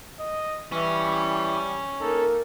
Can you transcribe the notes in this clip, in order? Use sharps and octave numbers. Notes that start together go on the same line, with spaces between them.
D#5
E3 G3 C#4
A#3 D#4 A4 A#4